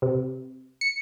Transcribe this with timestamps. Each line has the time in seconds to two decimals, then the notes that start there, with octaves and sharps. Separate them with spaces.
0.02 C3
0.81 C#7